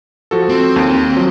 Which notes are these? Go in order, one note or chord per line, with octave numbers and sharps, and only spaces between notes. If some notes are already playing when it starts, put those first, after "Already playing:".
F3 F#4 A4
C4
D#2
F3 F#3